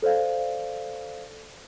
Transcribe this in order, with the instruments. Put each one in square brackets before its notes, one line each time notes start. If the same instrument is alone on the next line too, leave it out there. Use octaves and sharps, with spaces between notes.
[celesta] A4 C5 D5 F5